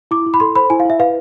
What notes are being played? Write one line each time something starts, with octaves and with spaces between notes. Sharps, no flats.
E4 D6
E4
B5
A4 C6
C5 B5
E4 G#5
F5
E4 E5
B4 F5